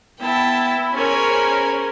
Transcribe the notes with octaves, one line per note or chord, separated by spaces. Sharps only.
B3 E4 G5 A5
C#4 G#4 A#4 C5 C#5 G#5 B5